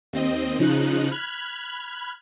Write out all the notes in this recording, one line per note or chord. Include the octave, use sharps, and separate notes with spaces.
D#2 C4 D#5
C#3 F3 D#4 F#6
B5 F6 F#6 G#6